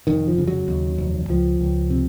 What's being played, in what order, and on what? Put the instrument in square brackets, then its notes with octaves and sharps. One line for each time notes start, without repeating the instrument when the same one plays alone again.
[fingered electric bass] F1 D#3
F3
C#3
F#3
D#2
F1
C#2 F3
C#2
C3